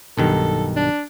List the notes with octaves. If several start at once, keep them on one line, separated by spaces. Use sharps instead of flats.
B1 G2 D#3 A4
D4